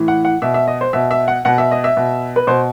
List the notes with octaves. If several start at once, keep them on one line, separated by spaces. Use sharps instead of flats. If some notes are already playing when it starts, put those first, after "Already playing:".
Already playing: A2 E3
F#5
F#5
B2 E5
E5
D#5
C5
B2 E5
E5
F#5
B2 F#5
E5
D#5
E5
B2
B4
B2 C5